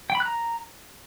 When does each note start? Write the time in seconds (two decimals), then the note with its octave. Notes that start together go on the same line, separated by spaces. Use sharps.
0.10 G5
0.15 B5
0.20 F#6
0.25 A#5